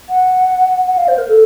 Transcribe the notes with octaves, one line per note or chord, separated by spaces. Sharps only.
F#5
F#5
F5
C5
A#4
A4